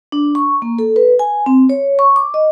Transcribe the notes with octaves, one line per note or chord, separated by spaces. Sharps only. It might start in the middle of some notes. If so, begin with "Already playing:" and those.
D4
C#6
A#3
A4
B4
G#5
C4
C#5
C#6
D6
D#5